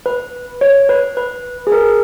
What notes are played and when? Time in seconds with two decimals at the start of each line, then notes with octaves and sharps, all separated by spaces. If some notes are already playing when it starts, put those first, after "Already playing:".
0.06 B4
0.61 C#5
0.89 B4
1.17 B4
1.67 G#4
1.72 A#4